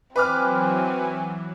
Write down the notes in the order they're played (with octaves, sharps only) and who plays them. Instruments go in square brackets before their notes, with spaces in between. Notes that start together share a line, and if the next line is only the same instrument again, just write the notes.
[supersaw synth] E3 F#3 [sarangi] C4 [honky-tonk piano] B4 D6 F6 [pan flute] G#5